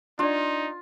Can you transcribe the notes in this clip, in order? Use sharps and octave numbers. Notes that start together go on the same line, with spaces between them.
D4 D#4 F4 D5